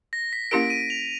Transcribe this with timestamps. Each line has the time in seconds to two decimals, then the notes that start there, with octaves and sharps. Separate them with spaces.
0.13 A#6
0.33 B6
0.51 A#3 C#4 E4 G4 A#4 D7
0.70 D#7
0.90 F7